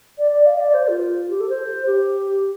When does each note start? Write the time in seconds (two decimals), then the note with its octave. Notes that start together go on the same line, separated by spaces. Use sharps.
0.17 D5
0.31 D5
0.46 F5
0.59 D5
0.73 C5
0.88 F4
1.29 G4
1.40 A4
1.48 C5
1.86 G4